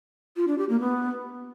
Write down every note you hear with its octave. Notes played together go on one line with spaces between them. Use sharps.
F4
D4
G4
A#3
B3